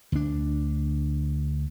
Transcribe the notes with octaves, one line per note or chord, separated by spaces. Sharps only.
D2 D4